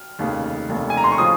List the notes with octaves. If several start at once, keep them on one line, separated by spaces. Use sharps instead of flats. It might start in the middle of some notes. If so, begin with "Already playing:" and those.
Already playing: F6
F1 D#2 C#3
F1 D#2 C#3
G#5
A#5
C6
C#6
C#3 F3 D#6